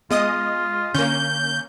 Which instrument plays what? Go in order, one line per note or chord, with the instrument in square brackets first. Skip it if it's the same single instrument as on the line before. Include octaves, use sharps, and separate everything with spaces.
[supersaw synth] G#3 D#5 D#6 [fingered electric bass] B3 [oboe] F4
[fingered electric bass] D3 [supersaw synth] A#3 C#4 [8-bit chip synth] G6